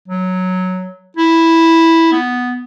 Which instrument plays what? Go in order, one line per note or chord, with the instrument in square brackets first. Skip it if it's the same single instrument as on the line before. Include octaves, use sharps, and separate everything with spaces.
[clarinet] F#3
E4
B3